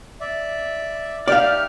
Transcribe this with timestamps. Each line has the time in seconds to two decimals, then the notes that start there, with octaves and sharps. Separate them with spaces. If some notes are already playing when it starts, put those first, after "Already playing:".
0.21 D5 E5
1.28 D#4 G4 D5 E5 F5 F6